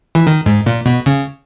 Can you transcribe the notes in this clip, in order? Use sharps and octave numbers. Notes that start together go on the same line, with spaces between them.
E3
D#3
G#2
A#2
B2
C#3